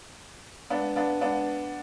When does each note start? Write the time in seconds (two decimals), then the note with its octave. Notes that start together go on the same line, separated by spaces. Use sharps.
0.70 B3 D4
0.96 B3 D4
1.21 B3 D4